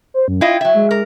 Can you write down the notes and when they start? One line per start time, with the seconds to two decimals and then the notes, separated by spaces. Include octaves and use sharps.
0.14 C5
0.28 F#2
0.41 E4 F4 D#5 G5
0.61 F#3 E5
0.74 G#3
0.91 A#4